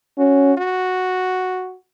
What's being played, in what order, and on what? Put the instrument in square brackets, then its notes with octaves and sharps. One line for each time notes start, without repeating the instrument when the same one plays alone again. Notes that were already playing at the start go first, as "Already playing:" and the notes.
[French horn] C#4 [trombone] F#4
[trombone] F#4